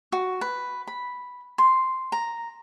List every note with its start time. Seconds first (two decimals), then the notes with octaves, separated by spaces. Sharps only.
0.12 F#4
0.41 B4
0.87 B5
1.58 C6
2.12 A#5